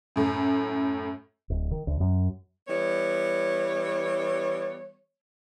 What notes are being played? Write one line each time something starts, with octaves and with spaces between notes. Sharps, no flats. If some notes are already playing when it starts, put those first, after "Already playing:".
F#2 A2
D1
D#3
D2
F#2
E3 G3 B3 C#5